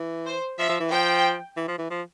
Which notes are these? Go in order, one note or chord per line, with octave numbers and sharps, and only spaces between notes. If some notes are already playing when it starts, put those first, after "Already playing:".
Already playing: E3
C5
F3 E5
F3
E3
F3 G5
E3
F3
E3
F3